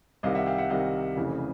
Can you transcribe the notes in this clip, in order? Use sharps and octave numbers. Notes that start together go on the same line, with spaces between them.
C2 C3 D#3 D#5 F5
E5 F#5
F5 G5
E5 F#5
C2 C3 D#3 D#5 F5
F1 F2 C#3 E3